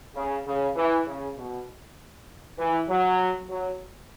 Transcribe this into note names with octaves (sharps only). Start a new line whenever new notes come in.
C#3
C#3
E3
C#3
B2
E3
F#3
F#3